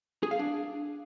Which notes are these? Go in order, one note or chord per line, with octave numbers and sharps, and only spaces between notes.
G#4
F5
D4